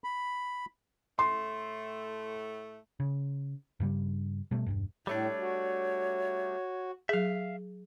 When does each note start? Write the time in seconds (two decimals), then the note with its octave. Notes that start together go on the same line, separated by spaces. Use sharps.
0.04 B5
1.19 A2 A3 C6
3.00 C#3
3.80 G2 C#3 G3
4.51 B2 G3 A3
4.66 E1 C#2 G2
5.07 A2 G3 A3 D4 C#5
5.39 F#4
7.09 F#3 G#4 E5 F5